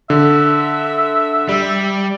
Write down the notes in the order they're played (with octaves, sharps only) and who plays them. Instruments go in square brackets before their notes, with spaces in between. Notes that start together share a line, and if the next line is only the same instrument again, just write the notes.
[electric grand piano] D3 [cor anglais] E5
[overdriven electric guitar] G3